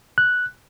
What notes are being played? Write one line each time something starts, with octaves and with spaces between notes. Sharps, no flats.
F#6